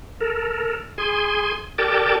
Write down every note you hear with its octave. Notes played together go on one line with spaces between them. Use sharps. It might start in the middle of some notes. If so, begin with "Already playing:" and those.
A4 A#4
G#4 G#5 C6
G4 A4 A#4 D5 G5 A5